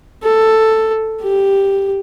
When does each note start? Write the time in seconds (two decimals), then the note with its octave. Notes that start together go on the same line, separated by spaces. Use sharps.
0.24 A4
1.22 G4